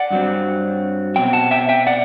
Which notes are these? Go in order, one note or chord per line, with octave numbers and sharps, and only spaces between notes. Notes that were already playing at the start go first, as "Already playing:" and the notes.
Already playing: D5 F#5
G2 F#3 C4
B2 F#3 C4 G5
F#5 A5
E5 G5
E5 G5
D5 F#5